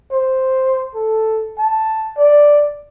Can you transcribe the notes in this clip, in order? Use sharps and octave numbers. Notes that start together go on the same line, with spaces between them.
C5
A4
A5
D5